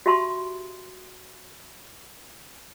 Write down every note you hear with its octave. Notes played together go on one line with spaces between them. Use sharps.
F#4 G4 E5 A5 B5 C6